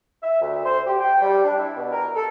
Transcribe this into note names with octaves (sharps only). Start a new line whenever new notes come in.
E5
D2
C5
G4
G5
G3
D4
E4
B2
A#4
A4